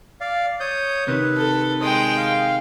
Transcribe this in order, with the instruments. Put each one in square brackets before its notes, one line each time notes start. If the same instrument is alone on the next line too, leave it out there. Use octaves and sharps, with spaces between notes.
[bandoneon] D5 F5
C#5 D#6 G6
[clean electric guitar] C3 D#3 [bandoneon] B4
[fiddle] A4
[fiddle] G#3 G5 [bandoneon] D#6
[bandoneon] F5